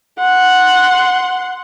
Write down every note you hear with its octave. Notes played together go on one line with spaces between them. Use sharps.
F#5 C6